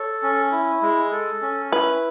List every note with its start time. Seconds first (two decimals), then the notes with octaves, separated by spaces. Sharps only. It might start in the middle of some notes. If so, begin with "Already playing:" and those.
Already playing: A4 C#5
0.22 C#4
0.52 E4
0.82 G#3
1.12 A4
1.42 C#4
1.72 E4 B4